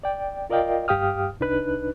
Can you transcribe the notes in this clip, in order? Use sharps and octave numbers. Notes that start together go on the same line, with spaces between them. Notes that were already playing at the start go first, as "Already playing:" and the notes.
D5 G5
F4 A#4 D5 D#5 F5 G5
G2 G4 F5 G5 D#6 F6
C2 D4 D#4 B4 F#6